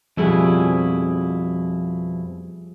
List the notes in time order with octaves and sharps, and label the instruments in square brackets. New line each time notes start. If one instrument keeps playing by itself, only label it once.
[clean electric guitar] F2 B2 E4 [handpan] F3 G3 G#4